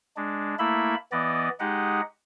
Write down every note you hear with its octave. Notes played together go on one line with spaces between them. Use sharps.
G#3 D4
A3 A#3 E4 E5 B5
E3 B3 D5 D#5
G#3 D#4 G4 D#5 F#5